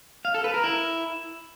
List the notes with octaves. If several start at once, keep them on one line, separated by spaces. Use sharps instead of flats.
F5
A4
B4
A#4
E4